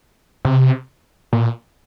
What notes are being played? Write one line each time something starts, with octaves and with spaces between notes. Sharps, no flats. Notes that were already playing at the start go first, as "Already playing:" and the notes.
C3
A#2